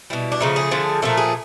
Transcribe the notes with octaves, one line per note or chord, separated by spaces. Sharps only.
B2 G3 E4
D4
C#3 F3 A3 D#4
G#4
D3 F3 A3
A#2 F3 A3 A4
G#4